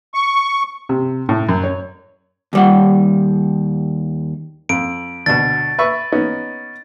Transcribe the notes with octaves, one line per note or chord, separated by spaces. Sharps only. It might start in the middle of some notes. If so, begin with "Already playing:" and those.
C#6
C3
A2
F#2
C#5
D#2 G3 F#5
F2 D7
D2 B2 A6
B4 E5 C#6
B3 C#4 D#4